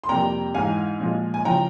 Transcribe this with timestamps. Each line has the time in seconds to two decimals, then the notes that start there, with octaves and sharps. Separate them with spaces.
0.04 C6
0.09 F2 C3 G3 A#3 G5 A#5
0.54 G#2 E3 G#3 F5 G#5
1.00 A#2 F3 G#3
1.34 G#5
1.45 C#3 F3 G5 A#5